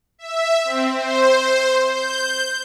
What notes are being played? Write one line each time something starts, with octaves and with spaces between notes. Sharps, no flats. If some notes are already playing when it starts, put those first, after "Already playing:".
E5
C4
C5
G6